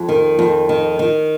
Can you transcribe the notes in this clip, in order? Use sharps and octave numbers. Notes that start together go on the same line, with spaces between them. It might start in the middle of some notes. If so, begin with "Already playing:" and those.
Already playing: F2
D#3
F2
D#3
D#3